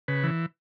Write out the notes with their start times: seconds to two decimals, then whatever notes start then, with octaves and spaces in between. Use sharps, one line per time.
0.08 C#3 B4
0.23 E3